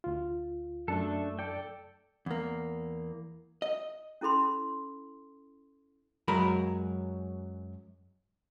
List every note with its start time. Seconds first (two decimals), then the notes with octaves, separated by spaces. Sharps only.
0.04 D2 F4
0.88 F#2 A3 D4 A4 A5
1.39 A4 D5 G5
2.26 E2 A#3
3.62 D#5
4.21 C#4 E4 A4 B5 C6
6.28 F#2 F#3 G#3 A#4 B5